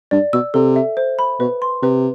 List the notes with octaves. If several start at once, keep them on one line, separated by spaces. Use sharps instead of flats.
G2 D5
B2 E6
C3 A4
E5
C5
B5
B2 B4
C6
C3 B4